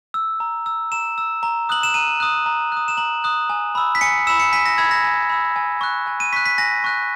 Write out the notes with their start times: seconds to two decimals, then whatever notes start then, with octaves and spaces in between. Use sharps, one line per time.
0.14 E6
0.40 A#5
0.66 E6
0.92 A#5 E7
1.18 E6
1.43 A#5
1.69 D#6 F#6 F#7
1.83 E7
1.94 A#5 D#7
2.20 D#6 F#6
2.46 A#5
2.72 D#6 F#6
2.88 E7
2.97 A#5 F#7
3.24 D#6 F#6
3.50 G#5
3.75 B5 E6
3.95 B6
4.01 G#5 C#7
4.27 B5 E6 E7
4.40 C#7
4.52 G#5 B6
4.65 A#6
4.78 B5 E6 G#6
4.91 A#6
5.04 G#5
5.30 B5 E6
5.56 G#5
5.81 C#6 F#6
6.07 G#5
6.20 D#7
6.33 C#6 F#6 B6
6.46 B6
6.58 G#5 A#6
6.84 C#6 F#6